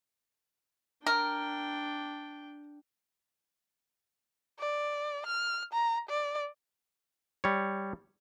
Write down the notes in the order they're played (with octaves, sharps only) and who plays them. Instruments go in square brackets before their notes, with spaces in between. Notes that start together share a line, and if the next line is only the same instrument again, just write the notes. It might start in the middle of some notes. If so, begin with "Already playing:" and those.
[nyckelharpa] D4 G5 [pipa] A#4
[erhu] D5
F6
A#5
D5
[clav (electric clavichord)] G3 C#5